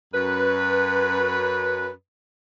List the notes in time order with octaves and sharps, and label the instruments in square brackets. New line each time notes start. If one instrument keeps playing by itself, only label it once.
[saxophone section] F#2 B4